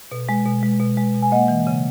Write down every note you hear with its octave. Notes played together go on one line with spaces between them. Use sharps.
B2
G#3
B2
G#3
B2
G#3
B2
G#5
A#3 D#5 F#5
E3
C#3